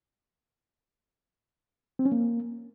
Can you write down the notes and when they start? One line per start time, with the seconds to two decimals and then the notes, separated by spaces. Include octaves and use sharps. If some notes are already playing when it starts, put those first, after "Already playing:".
1.99 C4
2.05 C#4
2.12 A#3